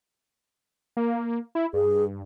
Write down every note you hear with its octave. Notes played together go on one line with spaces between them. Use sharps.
A#3
E4
G2 G#4